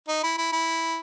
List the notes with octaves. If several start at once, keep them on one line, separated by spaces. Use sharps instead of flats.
D#4
E4
E4
E4